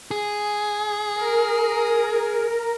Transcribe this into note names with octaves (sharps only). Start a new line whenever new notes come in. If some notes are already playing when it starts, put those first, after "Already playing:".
G#4
A#4